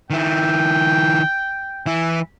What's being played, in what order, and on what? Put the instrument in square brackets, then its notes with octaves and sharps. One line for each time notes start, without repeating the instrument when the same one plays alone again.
[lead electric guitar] D#3 E4 [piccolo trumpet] G5
[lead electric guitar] E3 E4